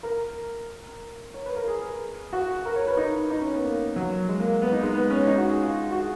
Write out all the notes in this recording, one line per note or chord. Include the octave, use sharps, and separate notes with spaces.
A#4
C#5
B4
A#4
G#4
F#4
A#4
C#5
B4
D#4
D#4
C#4
B3
A#3
F#3
G#3
A#3
B3
D#4
G#3
B3
C#4
D#4
F#4
G#4
F4
F#4
G#4